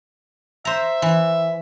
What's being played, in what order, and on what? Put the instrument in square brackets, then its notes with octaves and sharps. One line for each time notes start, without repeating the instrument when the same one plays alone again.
[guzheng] C5 A#5 [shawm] E5
[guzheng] E3